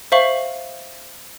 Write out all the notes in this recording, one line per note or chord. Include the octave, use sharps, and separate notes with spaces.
C5 E5 F5 C#6 F#7